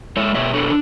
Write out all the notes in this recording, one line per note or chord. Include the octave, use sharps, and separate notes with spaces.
G#3 C#5 E5
B2 C#5 E5
D4 A4 C#5